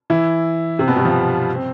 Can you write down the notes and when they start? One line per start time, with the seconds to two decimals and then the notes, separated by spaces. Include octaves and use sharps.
0.10 E3 E4
0.79 C3 C4
0.88 B2 B3
0.96 G2 G3
1.05 F3
1.55 C4